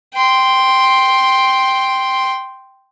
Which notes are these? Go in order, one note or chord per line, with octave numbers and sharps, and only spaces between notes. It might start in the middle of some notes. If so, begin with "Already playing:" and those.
G5 C6